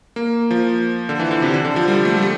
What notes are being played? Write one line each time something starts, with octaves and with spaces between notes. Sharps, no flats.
A#3
F3
D3
E3
D3
C3
D3
D3
F3
G3
A3
G3
A3